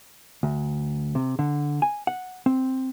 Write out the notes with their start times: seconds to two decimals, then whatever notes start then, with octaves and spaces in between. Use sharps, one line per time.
0.43 D2
1.15 C3
1.39 D3
1.82 G#5
2.07 F#5
2.46 C4